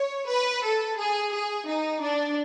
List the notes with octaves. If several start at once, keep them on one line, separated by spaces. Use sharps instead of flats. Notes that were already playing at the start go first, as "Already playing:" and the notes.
Already playing: C#5
B4
A4
G#4
G#4
D#4
D4